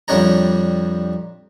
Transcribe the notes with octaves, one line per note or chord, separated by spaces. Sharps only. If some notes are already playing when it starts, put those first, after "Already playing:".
F2 G3 D4 C#5 A#5